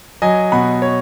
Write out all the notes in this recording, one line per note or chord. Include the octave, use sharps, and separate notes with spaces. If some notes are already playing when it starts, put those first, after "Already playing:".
F#3 D#5 G#5
B2 F#5 B5
C#5